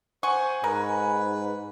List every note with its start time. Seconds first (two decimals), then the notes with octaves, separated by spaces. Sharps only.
0.23 C5 F#5 G#5 C#6
0.64 G#2 A#4 B4